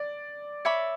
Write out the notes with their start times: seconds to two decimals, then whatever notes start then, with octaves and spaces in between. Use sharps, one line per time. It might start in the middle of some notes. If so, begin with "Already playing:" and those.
Already playing: D5
0.65 C#5 E5 B5 D6